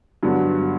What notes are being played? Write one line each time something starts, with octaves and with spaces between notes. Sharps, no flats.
G2 D3 F#3 B3